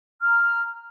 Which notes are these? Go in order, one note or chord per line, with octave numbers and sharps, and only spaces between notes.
A#5 F6